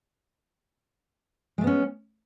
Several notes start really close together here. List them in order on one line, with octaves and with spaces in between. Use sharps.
G#3 A3 B3 C#4